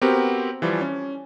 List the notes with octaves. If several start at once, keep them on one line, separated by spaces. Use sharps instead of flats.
B3 C4 F#4 G4 A#4
E3 F3 G3
C#4